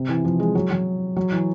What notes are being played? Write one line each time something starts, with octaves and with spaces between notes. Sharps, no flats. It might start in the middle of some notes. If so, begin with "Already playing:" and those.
Already playing: C3
E3
F3
G#3
F#3
F#3
F#3
E3